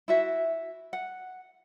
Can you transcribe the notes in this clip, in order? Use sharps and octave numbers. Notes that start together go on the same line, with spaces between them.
E4 F#4 E5
F#5